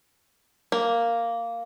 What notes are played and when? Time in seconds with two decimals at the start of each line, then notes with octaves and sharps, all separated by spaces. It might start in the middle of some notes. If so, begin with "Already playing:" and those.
0.72 A#3